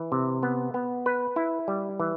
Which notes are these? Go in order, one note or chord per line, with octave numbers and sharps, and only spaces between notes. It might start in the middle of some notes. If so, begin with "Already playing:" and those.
Already playing: E3
C3
B3
B3
B4
E4
G3
E3